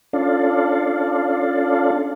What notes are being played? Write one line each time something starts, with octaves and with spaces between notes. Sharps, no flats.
C#4 D4 F4 A4 D5 F5